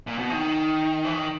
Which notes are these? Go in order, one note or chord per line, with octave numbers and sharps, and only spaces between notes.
A#2
B2
D#3
E3
D#3